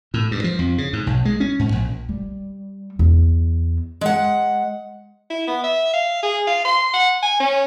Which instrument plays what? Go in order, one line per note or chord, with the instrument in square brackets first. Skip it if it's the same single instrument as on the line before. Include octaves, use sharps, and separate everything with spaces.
[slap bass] A2
G2
F3
F2
C#3
G#2
B1
G#3
C#4
G#2
A#1
[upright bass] G3
E2
[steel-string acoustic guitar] G#3 F#5
[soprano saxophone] E4
B3
E5
F5
G#4
F5
C6
F#5
G#5
C#4